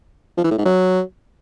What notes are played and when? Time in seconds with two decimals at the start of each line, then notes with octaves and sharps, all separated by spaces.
0.37 F3
0.44 E3
0.51 A2
0.58 G#2
0.65 F#3